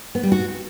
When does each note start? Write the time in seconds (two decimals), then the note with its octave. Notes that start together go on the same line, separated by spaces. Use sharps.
0.15 B3
0.23 G3
0.32 F#4